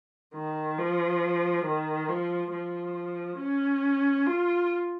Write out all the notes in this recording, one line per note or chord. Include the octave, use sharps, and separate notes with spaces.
D#3
F3
D#3
F3
F3
C#4
F4